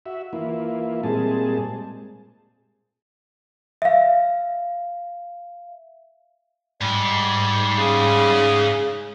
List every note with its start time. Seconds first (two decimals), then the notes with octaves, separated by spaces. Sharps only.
0.06 F#4 E5
0.33 E3 A#3 E4 F4
1.03 A#2 G3 G#3 C4 G#4 A5
3.82 E5 F5
6.81 G#2 G3
7.78 C#3